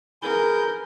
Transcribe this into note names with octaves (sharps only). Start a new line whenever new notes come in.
G#4 A#4 B4 G6